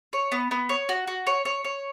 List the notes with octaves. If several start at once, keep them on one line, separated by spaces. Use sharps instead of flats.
C#5
B3
B3
C#5
F#4
F#4
C#5
C#5
C#5